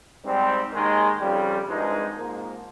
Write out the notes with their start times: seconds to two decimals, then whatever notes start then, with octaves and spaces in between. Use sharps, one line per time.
0.24 G#2 G3 C4
0.71 D#2 D#3 G#3 D#4
1.20 F2 C#3 G3
1.67 G#1 G2 F3 G#3 D#4
2.15 G#1 G#2 F3 A#3